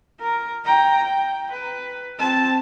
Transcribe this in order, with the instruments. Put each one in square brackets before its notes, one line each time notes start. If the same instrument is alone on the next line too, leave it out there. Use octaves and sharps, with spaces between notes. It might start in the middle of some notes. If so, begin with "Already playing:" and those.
[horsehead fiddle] A#4
G5 A#5
G5
B4
C4 A5